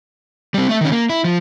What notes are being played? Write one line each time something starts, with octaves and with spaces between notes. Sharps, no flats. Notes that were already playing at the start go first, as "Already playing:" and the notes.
G3 C4
A3 E5
D#3 C#4
A#3
E4
F3